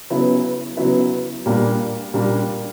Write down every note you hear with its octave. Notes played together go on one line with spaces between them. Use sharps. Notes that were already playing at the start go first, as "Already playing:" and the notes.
C#3 F#3 B3 E4
C#3 F#3 B3 E4
A#2 G3 A#3 D4
A#2 G3 A#3 D4